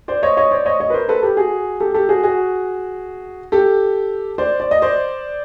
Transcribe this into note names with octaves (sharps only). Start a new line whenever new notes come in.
C5 D5
C#5 D#5
C#5 D#5
C5 D5
C#5 D#5
C#5 D#5
B4
A#4 C5
A4 B4
G4 A4
F#4 G#4
G4 A4
G4 A4
F#4 G#4
F#4 G#4
G4 A4
C5 D5
D5
D#5
C5 D5